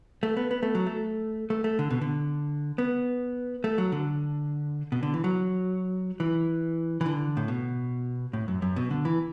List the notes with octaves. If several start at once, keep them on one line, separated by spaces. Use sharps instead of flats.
A3
B3
B3
A3
F#3
A3
A3
A3
D3
B2
D3
B3
A3
F#3
D3
B2
D3
E3
F#3
E3
E3
D3
A2
B2
A2
F#2
F#2
B2
D3
E3